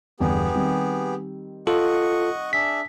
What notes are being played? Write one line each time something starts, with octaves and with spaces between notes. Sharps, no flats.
G1 E2 B3 G4 G#4
D#3 G3 C4
F4 A4 D#5 F#5 C#6
D4 G#4 E5 B6